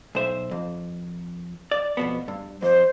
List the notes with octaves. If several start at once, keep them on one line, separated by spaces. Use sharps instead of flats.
B1 C5 E5
F2
D5
F2 B2 B3
G2
F2 C5